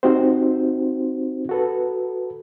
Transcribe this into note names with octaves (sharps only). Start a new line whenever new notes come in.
C4 D#4 F#4 G4 C5
F#4 A4 B4